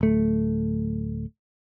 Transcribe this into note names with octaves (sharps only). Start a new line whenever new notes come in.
D1 A3